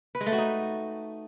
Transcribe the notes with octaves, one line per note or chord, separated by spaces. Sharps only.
B4
G#3
A3
F#4
D#4